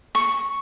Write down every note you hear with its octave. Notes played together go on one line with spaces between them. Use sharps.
C#6